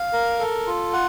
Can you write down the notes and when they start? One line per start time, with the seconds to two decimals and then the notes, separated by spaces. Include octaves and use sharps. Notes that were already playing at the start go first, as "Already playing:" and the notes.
Already playing: F5
0.13 A#4
0.39 A4
0.67 F4
0.93 F#5